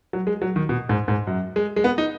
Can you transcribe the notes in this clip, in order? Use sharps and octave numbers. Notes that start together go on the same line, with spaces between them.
F#3
G#3
F#3
D#3
B2
G#2
G#2
F#2
G#3
G#3
B3
D#4